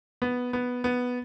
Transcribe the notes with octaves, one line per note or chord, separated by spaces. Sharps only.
B3
B3
B3